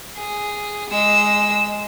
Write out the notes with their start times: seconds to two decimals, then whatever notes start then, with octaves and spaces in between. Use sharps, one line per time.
0.16 G#4
0.90 G#3 E6